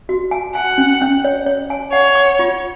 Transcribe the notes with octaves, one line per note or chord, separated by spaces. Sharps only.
F#4
G#5
F#5 G#5
C#4
C#4
C#5
C#5
G#5
C#5 F#5
C#6
F4